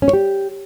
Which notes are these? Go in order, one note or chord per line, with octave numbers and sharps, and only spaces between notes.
C#4
C#5
G4